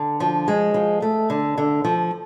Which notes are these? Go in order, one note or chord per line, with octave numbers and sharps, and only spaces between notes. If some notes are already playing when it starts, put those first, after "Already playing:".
Already playing: D3
F3
G#3
F3
A3
D3
D3
F3